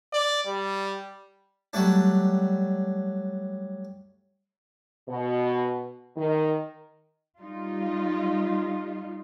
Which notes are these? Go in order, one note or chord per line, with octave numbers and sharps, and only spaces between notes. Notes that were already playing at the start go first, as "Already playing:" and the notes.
D5
G3
F#3 G3 A3 D4
B2
D#3
G3 D#4 F4